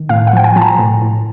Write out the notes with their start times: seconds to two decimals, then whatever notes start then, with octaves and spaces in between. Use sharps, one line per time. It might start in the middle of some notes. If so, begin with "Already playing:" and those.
Already playing: D#3
0.09 A2 F5
0.27 F#5
0.33 F3 G5
0.44 G#5
0.56 F3 A5
0.62 A#5
0.79 A2
1.02 A2